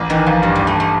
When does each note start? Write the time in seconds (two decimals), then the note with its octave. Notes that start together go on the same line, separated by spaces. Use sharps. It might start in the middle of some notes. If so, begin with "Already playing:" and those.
Already playing: A1
0.10 D#3 E3
0.26 A1 F3
0.42 G2 G3
0.55 A1 G3
0.67 A3
0.80 A3